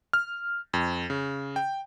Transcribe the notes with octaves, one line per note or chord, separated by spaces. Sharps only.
F6
F2
C#3
G5